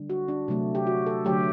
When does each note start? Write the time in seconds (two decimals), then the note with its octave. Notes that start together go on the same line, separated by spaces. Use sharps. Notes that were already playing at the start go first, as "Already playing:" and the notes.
Already playing: D3 G3
0.10 F#4
0.28 D4
0.48 C3 F#3 A3
0.75 G4
0.87 F#4
1.07 A4
1.25 D3 F#3 A3 G4